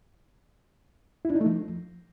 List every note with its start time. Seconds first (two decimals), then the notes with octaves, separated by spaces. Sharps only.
1.25 E4
1.30 D4
1.35 D#4
1.41 A3
1.46 F3